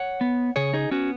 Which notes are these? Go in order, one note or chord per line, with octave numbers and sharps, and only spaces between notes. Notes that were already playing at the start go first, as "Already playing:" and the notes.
Already playing: C#5 F#5
B3
C#3 G#4 C#5
D#4 G#4
B3 C#4 F#4